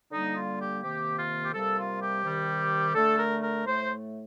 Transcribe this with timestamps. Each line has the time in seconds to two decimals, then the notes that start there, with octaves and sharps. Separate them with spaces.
0.12 D3 G3 A#3 D#4
0.36 F4
0.59 G4
0.83 C3 D#3 A#3 G4
1.18 F4
1.44 G4
1.53 C3 G3 A#3 A4
1.77 F4
2.00 G4
2.24 C3 D#3 G3
2.95 D3 A3 A4
3.18 A#4
3.41 A#4
3.65 A2 A3 C5